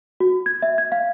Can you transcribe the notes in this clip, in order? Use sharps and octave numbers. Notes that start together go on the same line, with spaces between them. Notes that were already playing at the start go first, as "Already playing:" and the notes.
F#4
G#6
E5
G#6
F5